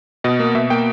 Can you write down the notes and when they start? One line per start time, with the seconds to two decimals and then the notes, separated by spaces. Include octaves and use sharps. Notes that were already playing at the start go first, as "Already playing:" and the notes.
0.24 B2 D#5
0.40 A#3
0.55 B2 E5
0.70 A#3 G5